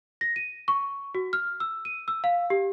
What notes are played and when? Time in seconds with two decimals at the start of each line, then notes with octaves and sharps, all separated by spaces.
0.21 A#6
0.36 D#7
0.68 C#6
1.15 F#4
1.33 F6
1.60 E6
1.85 D#7
2.08 E6
2.24 F5
2.50 G4